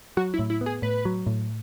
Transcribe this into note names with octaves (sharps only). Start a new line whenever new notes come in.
F#3 F#4
E4
A2
E4
B3
G#4
A2 B4
F#3
A2